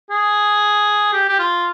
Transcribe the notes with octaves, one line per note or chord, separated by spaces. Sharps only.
G#4
G4
G4
F4